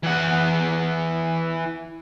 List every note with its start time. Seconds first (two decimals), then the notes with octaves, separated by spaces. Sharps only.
0.04 E3 F#5